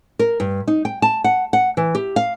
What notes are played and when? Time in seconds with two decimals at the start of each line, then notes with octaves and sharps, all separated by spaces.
0.19 A#4
0.40 G2
0.67 D#4
0.85 G5
1.02 A5
1.24 F#5
1.53 F#5
1.77 E3
1.95 G4
2.16 F5